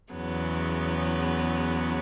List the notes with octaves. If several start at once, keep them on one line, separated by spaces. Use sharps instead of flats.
E2 C#3 F#3 B3